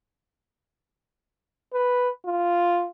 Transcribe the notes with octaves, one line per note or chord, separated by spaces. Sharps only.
B4
F4